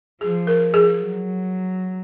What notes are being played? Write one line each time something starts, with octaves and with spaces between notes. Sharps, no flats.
F3 G#4
A#4
G#4
F#3